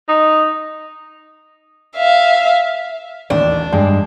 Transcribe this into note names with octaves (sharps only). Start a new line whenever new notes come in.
D#4
E5 F5
E1 A1 D#2 D4
G2 G#3